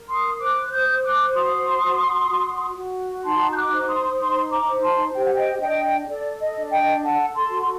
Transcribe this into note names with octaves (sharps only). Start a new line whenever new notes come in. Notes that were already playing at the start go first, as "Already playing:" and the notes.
Already playing: A#4
C6 D#6
C5 D6 F#6
F#6
D#6 G6
C5
D6 F#6
F#4 C6 D#6
F#4
F#4
F#4
D#4 A5 C6
G6
D6 F#6
C5
C6 D#6
D#4 C6 D#6
A#5 D6
C5
A5 C6
G4 G5
F#5
D#5 G5
D4 D#5 G5
A4 D5
D#5
D4
D#5 G5
A4 F#5 A5
A5 C6
F#4
C6